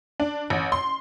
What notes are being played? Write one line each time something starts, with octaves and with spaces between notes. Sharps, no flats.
D4
A1
C6